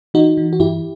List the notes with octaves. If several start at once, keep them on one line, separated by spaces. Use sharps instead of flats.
E3 D#4 F#4
E3
F#4
G2 E4 G4